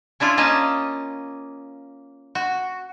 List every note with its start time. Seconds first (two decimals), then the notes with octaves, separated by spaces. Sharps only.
0.20 C#4 D4 E4 F4
0.37 A#3 C#4 D#5 A5
2.35 F#4